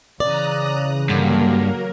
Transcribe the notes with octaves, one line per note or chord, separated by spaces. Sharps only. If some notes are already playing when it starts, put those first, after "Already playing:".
C#3 E3 D5 A#5 D#6 F#6
G2 D3 F#3 A#3 A#4